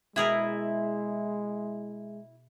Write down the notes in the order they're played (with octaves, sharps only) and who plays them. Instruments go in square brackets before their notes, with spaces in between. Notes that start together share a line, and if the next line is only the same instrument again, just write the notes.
[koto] B2 G#4 A#4 [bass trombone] G#3 [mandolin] E4